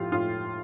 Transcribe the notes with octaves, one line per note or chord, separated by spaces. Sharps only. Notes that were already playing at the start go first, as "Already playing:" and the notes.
Already playing: A2 F3 F4 G4
A2 F4